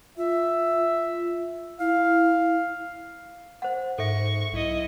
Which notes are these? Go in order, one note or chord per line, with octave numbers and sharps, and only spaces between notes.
F4 E5
E4 F5
C5 F#5
G#2 A4 E5 C#6
B1 E4 D#5